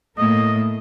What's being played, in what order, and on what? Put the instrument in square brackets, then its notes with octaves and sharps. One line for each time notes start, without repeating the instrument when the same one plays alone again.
[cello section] A2 A3 A#3 [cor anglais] D#5